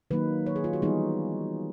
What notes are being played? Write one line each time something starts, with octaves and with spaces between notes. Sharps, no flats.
D#3 F#3 A#3 D#4 B4
C#5
G#4
F4
F#4
E3 G3 B3 D#4 G#4